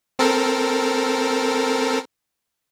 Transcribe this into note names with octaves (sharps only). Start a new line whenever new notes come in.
C4 A4 A#4